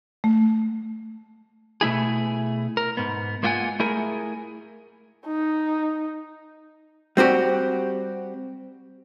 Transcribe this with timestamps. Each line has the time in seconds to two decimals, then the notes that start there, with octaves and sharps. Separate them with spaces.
0.24 A3
1.81 B2 A3 E4 G#4
2.77 A#4
2.97 G#2 B3
3.43 G#3 A#3 F4 E5 F#5 G#5
3.80 A3 E4 G#4 A#4
5.27 D#4
7.17 G3 C4 F#4 G4